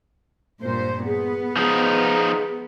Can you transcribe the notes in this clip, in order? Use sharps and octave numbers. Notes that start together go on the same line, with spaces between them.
G2 A#2 C5
B3 G#4
F3 D#4 G#4